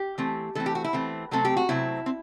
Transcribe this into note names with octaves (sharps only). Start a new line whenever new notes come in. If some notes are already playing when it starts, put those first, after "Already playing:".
Already playing: G4
E3 A3 C4
E3 A3 C4 A4
G4
F#4
E4
E3 A3 C4
C3 F#3 A3 C4 A4
G4
F#4
C3 F#3 A3 C4 E4
C4